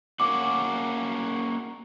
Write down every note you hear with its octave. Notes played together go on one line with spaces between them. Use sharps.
A#3 C#4 F#4 D6